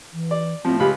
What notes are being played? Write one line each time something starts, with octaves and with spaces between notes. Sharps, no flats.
E3
D5
A2 F3 C4
C#2 G4 F5 B5